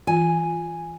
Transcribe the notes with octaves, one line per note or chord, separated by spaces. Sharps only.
E3 F4 G#5